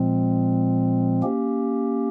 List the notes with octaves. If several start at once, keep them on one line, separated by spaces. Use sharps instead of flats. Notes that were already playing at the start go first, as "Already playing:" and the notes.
Already playing: A#2 F3 G#3 C4
A#3 C#4 G4